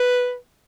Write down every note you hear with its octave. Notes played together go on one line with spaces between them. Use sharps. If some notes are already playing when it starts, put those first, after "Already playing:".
Already playing: B4